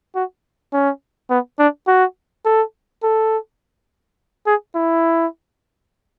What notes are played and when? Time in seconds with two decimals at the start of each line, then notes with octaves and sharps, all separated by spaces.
0.15 F#4
0.73 C#4
1.30 B3
1.59 D4
1.87 F#4
2.45 A4
3.03 A4
4.46 G#4
4.75 E4